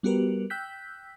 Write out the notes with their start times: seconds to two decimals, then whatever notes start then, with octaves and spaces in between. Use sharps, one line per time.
0.03 G3 B3 F#4 G4 A#4 B4
0.50 G5 E6 F#6 G6 B6